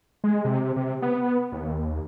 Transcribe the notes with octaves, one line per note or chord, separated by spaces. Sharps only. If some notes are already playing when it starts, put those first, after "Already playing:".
G#3
C3
C3
B3
D#2